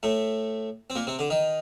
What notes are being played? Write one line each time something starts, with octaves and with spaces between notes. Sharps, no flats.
A2 A3
C4
A#2 A#3
C3 C4
D3 D4
D#3 D#4